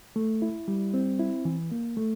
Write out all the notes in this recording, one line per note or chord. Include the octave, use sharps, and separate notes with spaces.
A3
E4
G3
C4
E4
E3
A#3
A3